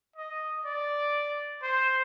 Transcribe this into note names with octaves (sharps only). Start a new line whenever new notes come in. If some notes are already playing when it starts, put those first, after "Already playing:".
D#5
D5
C5